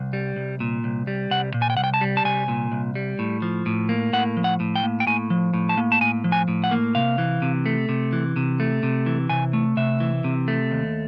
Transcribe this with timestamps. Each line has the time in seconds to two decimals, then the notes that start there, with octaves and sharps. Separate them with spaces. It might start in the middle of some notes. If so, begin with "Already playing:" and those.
Already playing: C2
0.13 G3
0.36 C2
0.60 A#2
0.84 C2
1.07 G3
1.31 C2 F#5
1.54 A#2
1.62 G#5
1.70 G5
1.77 C2 F#5
1.84 G5
1.94 A5
2.01 G3
2.17 A5
2.25 C2 G#5
2.48 A#2
2.72 C2
2.95 G3
3.19 A2
3.42 F3
3.66 A2
3.89 A#3
4.13 A2 F#5
4.37 F3
4.44 F#5
4.60 A2
4.76 G5
4.83 A#3
5.00 G5
5.07 A2 G#5
5.30 F3
5.54 A2
5.69 A5
5.77 A#3
5.92 A5
6.01 A2 G#5
6.24 F3
6.32 G#5
6.48 A2
6.64 F#5
6.71 A#3
6.95 C3 F5
7.18 E3
7.42 C3
7.66 A3
7.89 C3
8.13 E3
8.36 C3
8.60 A3
8.83 C3
9.06 E3
9.30 C3 G#5
9.53 A3
9.77 C3 E5
10.00 E3
10.24 C3
10.48 A3
10.71 D#2